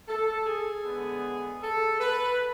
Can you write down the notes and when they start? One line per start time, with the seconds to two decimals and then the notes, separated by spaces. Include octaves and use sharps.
0.08 A4
0.46 G#4
0.85 D3 G#3 B3
1.62 A4
2.00 B4